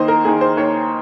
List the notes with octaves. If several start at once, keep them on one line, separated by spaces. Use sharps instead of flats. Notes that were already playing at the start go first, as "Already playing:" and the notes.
Already playing: D#2 D#3 A#3 C5 D#5
A#4
D#3 A#3 G#4
C5
D#2 C#5